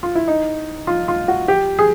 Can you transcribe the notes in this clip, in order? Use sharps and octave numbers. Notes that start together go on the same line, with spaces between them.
F4
E4
D#4
F4
F4
F#4
G4
G#4